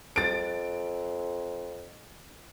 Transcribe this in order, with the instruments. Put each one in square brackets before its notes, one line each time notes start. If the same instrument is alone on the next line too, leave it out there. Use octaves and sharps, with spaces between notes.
[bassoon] F2 [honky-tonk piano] A6 D7